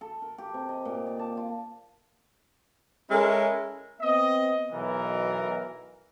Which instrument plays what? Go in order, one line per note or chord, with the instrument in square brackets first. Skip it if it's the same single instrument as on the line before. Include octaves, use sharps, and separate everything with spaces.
[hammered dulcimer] A4
A#4
G4
C3
D#5
A#2
D5
A5
F4
[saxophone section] G#3 C#4 E4 A4 A#4
[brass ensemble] B3 C4 D#5
B1 B2 E3 A#4